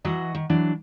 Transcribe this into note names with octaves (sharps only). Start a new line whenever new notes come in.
E3 F#3 F#4 D#5
D#3
E3 F#3 D4